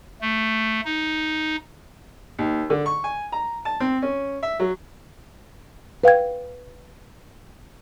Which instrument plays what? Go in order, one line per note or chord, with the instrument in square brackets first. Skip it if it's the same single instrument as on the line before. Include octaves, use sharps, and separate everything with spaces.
[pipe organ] A3
D#4
[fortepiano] D#2
D3
C#6
G#5
A#5
A5
C4
C#4
E5
F#3
[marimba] B4 F5 G5 G#6